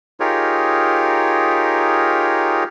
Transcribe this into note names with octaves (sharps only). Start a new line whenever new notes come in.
D#4 F4 G4 G#4 A#4 C#5